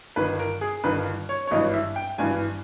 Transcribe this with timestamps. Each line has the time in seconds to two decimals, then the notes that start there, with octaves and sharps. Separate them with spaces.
0.16 G1 G2 D#3 B4
0.39 A#4
0.61 G#4
0.84 G1 G2 D#3 B4
1.29 C#5
1.47 C#5
1.51 G#1 G2 E3 D#5
1.74 E5
1.96 G5
2.18 G#1 G2 E3 G#5